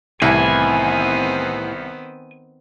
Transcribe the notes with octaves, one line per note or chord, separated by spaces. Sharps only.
C2 A2 D#3 E3 B3 C4 E4 G#5